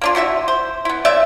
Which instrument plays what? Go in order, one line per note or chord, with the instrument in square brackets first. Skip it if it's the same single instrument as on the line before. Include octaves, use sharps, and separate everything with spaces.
[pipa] A#3 D4 F4
E4 F#4 C5 E5
C5
B3 E4
C#3 C4 D5 E5